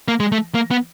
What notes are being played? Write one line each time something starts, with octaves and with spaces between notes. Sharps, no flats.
A#3
G#3
A3
A#3
B3